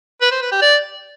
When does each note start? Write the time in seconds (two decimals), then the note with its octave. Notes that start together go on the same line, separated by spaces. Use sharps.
0.22 B4
0.32 C5
0.42 B4
0.52 G4
0.62 D5